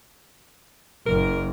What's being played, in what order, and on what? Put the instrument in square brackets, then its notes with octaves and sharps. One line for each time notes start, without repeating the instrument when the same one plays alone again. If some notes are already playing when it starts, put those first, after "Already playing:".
[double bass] F#1 [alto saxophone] A#4